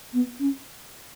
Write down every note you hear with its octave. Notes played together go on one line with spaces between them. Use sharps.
B3
C#4